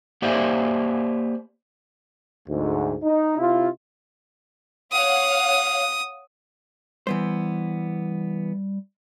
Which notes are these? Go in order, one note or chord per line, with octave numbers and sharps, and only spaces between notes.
A#3 G4 C5 D5 E5
D2 G#2
D#4
C3 E4 F4
C#5 F5 F#5 D#6
E3 G3 B3 C5